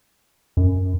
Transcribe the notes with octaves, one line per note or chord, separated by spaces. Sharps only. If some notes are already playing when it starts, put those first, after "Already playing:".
F#2